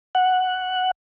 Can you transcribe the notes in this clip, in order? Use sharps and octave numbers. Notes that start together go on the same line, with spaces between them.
F#5